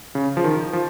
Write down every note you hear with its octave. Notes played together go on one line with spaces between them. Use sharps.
C#3
F3
D#3
F3